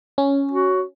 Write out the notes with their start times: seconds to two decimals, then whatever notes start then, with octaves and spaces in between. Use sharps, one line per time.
0.18 C#4
0.51 F#4